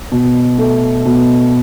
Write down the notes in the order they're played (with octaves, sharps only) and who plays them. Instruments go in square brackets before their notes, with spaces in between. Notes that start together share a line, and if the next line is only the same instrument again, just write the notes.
[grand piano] B2
A3
B2